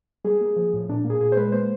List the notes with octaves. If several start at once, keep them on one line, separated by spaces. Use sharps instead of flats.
G3 G#4
A#3
F3
A2
A#2 D4
A#3
G#4
A#2 G#4
C5
G#3 B4
A#3 C5